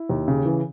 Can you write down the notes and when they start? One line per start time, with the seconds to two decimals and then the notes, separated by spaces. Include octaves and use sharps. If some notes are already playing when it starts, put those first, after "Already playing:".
Already playing: E4
0.09 D#2
0.28 C#3
0.46 E3